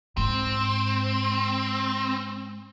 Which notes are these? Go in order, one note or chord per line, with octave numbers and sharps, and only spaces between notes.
G#2 C4